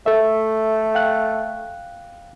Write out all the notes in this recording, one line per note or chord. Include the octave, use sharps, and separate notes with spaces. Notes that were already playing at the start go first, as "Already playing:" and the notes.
A3 A4 E5
F5 G5 F#6